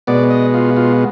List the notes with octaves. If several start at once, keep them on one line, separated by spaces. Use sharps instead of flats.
B2 G#3 B3 D5
D#5
F4
F4